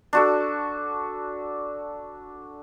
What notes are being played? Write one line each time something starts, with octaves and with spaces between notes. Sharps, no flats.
D4 F#4 A4